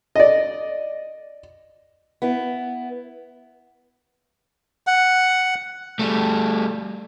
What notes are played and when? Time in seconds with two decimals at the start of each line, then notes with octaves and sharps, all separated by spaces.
0.16 D5 D#5
2.22 B3 E4
4.87 F#5
5.99 G3 A3